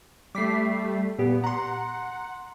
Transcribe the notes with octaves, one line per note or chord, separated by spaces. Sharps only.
G3 A3 D6 B6 C7
A#2 B3 G4
F#5 A#5 C6